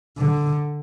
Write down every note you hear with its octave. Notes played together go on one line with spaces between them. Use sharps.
D3